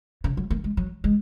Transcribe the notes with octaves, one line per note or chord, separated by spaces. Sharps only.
C#3
F#3
A#3
G#3
F#3
G#3